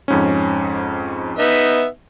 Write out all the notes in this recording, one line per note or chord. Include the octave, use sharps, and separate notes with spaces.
F2 G#2 C#4
B3 D#4 E5